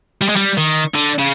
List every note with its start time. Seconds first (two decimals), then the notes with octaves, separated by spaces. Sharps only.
0.21 G3
0.29 G#3
0.36 G3
0.57 D#3
0.95 D3
1.19 C#3